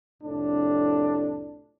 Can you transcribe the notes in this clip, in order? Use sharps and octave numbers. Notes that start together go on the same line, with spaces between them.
C2 F2 A2 D4